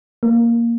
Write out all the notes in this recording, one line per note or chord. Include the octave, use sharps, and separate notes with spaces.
A#3